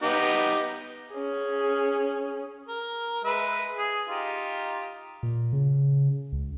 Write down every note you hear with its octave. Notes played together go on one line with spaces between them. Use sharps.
B3 D#4 G4
C#4 G#4
A#4
G#3 B4 E5
G#4
D#4 F4 G4
A#2
C#3
C#2